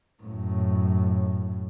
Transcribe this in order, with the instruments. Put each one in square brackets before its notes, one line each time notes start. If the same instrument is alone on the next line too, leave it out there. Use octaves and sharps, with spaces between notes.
[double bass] F#2 A2